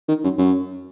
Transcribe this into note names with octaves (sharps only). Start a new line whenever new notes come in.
D#3
F#2
F#2